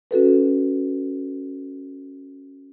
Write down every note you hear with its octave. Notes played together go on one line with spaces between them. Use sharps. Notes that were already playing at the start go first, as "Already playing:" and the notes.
C#4 F#4 A4 B4